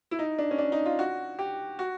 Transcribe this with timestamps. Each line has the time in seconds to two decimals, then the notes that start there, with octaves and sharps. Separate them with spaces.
0.11 E4
0.19 D#4
0.39 D4
0.51 C#4
0.58 D4
0.72 D#4
0.86 F4
0.99 F#4
1.39 G4
1.79 F#4